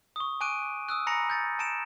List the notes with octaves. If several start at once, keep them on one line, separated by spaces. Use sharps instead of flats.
C#6 D#6
G#5 C#6 D6 F#6 D7 D#7
D#6 E6 F#6
G#5 A#5 B5 A#6 C#7
G6 A6 C#7
A5 C#7 D7 E7